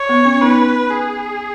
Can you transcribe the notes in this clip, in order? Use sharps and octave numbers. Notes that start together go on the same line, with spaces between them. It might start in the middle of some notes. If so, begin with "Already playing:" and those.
Already playing: C#5
B3
C#4
B3 D#4 B4
G#4